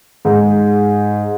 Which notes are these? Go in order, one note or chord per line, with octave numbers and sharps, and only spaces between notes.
G#2